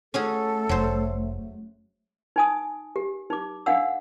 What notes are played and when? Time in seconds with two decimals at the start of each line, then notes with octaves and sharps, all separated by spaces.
0.14 A3 C#4 F#4 G#4 A4
0.69 F1 F#3 C5
2.36 D#4 G#5 D#6
2.96 G4
3.30 D#4 D6
3.66 D4 F5 F#5 E6